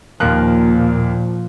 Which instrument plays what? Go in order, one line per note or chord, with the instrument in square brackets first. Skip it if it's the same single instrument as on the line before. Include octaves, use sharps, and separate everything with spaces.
[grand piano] D#2 A#4 F#6 [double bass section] A#2 [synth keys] F3